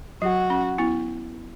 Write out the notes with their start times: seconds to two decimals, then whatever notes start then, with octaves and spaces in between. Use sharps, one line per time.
0.22 F#3 F#4
0.50 C#4
0.78 B3 E4